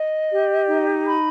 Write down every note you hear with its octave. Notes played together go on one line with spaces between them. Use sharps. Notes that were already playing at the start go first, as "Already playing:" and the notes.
Already playing: D#5
G4
D#4
B5